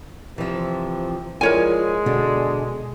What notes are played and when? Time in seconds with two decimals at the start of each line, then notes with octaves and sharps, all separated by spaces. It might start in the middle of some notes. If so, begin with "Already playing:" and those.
0.38 C3 E3 F3
1.41 F3 G#3 E4 F4 A#4 C#5 D5 G#5
2.06 B2 D3 B3 D4